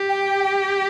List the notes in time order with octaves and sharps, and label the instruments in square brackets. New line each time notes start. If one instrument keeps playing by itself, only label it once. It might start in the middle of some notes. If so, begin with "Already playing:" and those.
Already playing: [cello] G4
[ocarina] G5
G5